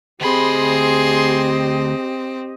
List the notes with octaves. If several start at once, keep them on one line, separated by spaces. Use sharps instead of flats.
D2 C4 G4 G#4 D#5 B5 C6